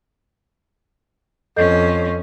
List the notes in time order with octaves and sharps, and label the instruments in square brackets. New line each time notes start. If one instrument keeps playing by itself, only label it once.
[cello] F2 C#4 [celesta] A4 D#5 G6